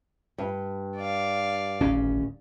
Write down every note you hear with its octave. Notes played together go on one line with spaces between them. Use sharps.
G2
D5 F5
D1 G#1 C#4